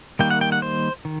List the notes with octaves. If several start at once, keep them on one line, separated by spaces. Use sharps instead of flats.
D#3 G3 A#3 G5
F#5
G5
F#5
C5
D#3